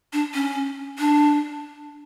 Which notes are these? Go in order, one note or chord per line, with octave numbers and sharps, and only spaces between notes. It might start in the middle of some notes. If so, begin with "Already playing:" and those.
D4
C#4
D4